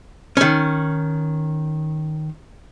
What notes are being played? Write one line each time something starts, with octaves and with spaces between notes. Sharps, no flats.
D#3 C#4